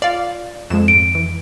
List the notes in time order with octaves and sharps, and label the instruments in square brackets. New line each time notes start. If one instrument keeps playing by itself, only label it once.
[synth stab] F4 [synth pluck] D5 F5
[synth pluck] F2 [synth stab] G#3 E7
[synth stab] G#1 [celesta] D7
[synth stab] E3